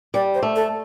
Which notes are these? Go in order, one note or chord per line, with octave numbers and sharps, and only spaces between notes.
G3 D5
C5
A3
A4